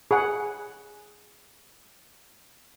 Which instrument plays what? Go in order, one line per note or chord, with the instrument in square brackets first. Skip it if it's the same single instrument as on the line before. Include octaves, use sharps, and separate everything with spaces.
[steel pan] G#4 F#5